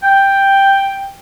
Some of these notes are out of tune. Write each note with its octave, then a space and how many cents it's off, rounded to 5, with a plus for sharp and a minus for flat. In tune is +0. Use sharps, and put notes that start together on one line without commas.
G5 +5